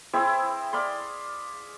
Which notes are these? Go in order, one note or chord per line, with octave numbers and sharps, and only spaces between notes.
C4 E4 G#4 E5
D5 F5 B5 C6